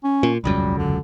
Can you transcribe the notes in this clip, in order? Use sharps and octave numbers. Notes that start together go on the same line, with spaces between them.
C#4
A#2
E1 C#2 F#2 G3
D3